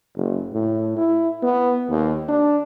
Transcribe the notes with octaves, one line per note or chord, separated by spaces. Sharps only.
F#1
A2
E4
B3
D#2
D4